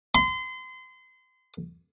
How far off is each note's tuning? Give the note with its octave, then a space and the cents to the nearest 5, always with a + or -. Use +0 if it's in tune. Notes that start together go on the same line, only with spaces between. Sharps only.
C6 -30